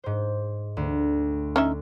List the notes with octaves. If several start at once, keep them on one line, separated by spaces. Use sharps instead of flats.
G#2 C5
D2
C#4 D#4 E5